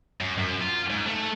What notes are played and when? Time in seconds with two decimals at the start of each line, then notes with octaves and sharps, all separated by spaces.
0.21 F#2
0.38 F#2
0.61 F4
0.90 G#2
1.07 A3